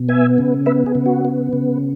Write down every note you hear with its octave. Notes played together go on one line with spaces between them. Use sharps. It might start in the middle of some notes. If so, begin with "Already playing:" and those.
Already playing: B2
B3 E5 G#5
C#3
B3 B4 E5
G#4
C#3
F#4
B3
C#3